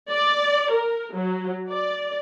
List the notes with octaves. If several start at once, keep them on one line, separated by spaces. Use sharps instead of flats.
D5
A#4
F#3
D5